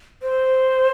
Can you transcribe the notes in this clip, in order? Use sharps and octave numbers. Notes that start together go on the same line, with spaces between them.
C5